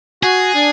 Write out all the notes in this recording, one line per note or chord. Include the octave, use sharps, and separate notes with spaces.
F#4 G#4
D4